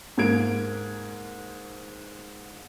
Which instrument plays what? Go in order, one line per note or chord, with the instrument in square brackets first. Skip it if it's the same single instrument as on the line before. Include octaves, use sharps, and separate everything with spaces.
[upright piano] G#2 A#3 G#6 D7